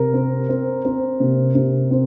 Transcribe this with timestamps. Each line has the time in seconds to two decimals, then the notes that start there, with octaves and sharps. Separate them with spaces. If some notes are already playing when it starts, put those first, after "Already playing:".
Already playing: C3 A#4
0.14 C4
0.49 C4
0.85 C4
1.20 C3
1.55 C3
1.91 C4